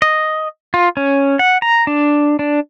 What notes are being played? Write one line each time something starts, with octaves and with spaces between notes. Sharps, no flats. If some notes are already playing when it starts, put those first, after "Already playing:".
D#5
F4
C#4
F#5
A#5
D4
D4